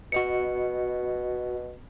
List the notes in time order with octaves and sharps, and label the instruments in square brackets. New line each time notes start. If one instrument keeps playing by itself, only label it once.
[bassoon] B2 [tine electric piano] F#4 D#5 C#7